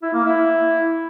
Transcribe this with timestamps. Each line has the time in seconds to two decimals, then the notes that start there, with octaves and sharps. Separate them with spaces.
0.03 E4
0.14 A#3
0.25 E4